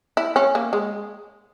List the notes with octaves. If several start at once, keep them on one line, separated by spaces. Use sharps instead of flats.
E4
C#4
A#3
G#3